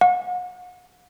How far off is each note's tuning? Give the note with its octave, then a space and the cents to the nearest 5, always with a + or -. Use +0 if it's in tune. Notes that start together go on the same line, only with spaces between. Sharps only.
F#5 -45